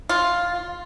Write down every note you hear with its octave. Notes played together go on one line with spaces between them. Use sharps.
F4